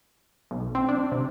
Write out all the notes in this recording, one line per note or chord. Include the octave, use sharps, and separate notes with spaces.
B1
C4
D4
C3